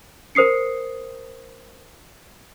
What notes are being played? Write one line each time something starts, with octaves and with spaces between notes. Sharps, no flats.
A#4 C5 D#6 C7 C#7